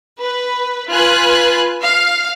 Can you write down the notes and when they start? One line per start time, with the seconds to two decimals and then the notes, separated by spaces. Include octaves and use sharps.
0.21 B4
0.90 F4 B4 G#5 F#6
1.83 F5